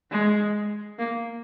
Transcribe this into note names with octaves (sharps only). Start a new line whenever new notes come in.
G#3
A#3